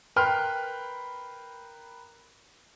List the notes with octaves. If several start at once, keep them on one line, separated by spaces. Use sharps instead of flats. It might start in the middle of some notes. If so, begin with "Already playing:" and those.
A#4 B4 G5 B5 C6 F6